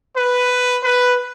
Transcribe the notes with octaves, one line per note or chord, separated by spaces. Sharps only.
B4
B4